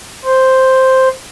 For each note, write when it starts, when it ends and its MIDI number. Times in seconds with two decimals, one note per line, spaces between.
0.25 1.08 72